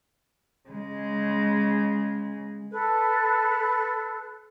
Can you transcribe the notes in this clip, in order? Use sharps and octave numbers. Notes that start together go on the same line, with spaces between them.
C#3 G#3
A4 B4 F#6